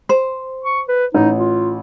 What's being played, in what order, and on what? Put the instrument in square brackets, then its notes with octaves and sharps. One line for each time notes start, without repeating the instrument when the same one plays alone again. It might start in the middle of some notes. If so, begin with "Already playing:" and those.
[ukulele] C5
[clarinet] C#6
B4
[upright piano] A1 [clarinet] D#4
[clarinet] F4